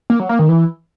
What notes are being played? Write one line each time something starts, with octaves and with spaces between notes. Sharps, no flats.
A#3
F#3
A#3
D#3
E3